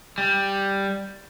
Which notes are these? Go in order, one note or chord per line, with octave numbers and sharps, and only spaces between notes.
G3